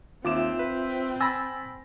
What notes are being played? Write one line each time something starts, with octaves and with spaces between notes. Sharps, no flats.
D#2 C4 F4 E5 D6 E7
B4
G#5 B5 E6 A6 A#6